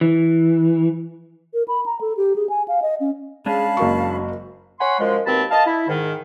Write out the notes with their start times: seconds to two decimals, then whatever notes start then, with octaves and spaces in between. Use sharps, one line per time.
0.01 E3
1.54 A#4
1.68 B5
1.86 A#5
2.01 A4
2.17 G4
2.36 G#4
2.50 G#5
2.68 F5
2.82 D#5
3.00 C#4
3.46 G#3 C#4 D4 G#4 F5 A5 B5
3.77 F#1 A#3 F#4 C#6
4.79 C#5 F#5 G#5 B5 C6
4.99 F#2 F3 G#3
5.26 D#2 B2 C4 A5 B5
5.50 D#5 F5 A5
5.66 E4
5.88 G#2 D#3